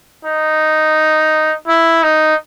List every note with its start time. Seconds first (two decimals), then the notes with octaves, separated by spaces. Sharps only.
0.25 D#4
1.68 E4
2.03 D#4